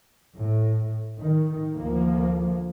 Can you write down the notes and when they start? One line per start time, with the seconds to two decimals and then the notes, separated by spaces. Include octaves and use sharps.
0.36 A2
1.19 D#3
1.75 D2 F3 A#3